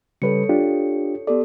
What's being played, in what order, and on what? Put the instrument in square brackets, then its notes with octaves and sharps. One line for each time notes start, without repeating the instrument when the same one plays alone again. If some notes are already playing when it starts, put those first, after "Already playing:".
[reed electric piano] C#3 G3 B4 [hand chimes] A4 C#5 C#7
[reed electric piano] D4 F4 G4
[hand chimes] B3 G4 A4 [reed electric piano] D5